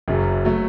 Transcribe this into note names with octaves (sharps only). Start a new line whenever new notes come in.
F#1 F#2 C#3 F#3
F#3 A3